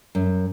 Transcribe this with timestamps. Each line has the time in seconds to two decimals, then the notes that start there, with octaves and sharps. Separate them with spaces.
0.15 F#2